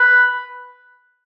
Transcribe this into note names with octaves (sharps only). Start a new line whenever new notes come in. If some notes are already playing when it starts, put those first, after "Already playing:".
Already playing: B4